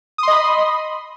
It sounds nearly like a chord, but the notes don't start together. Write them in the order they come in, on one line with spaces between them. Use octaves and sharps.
D#6 C6 D#5 B5